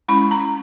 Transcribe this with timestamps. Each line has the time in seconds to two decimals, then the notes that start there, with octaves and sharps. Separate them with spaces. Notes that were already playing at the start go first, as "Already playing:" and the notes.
0.08 G#3 C#4 E4 B5
0.31 A#5